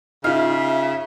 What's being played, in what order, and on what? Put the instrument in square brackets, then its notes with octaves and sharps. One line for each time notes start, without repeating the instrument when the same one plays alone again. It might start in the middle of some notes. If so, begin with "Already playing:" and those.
[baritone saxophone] C#3 [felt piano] D#4 F4 [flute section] E5 [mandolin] F5